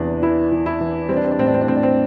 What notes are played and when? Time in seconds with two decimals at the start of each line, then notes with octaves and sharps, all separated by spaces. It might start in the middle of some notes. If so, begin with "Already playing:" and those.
Already playing: E2 C3 E3 D4
0.22 E3 E4
0.52 E3
0.66 E4
0.81 E3
1.09 G3 C4
1.16 D4
1.24 C4
1.32 D4
1.39 A2 C4
1.47 D4
1.54 C4
1.62 D4
1.68 A2 C4
1.76 D4
1.83 C4